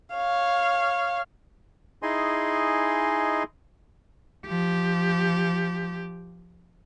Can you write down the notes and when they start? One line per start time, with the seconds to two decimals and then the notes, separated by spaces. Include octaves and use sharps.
0.15 C#5 F5
2.03 D#4 E4 G#4 D#5 G#5 C6
4.47 F3 G4